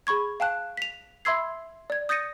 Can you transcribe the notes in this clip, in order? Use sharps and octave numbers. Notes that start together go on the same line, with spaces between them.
G#4 B5 C#6 G#6
F5 G5 A5 F#6
B6 F7
E5 B5 C6 E6 G#6 C7
D5 G#6
D#6 G6 A6 A#6 C#7 D#7